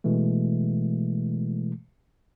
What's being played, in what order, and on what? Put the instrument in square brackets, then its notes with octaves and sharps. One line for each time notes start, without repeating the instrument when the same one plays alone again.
[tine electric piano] B2 E3 G#3 A3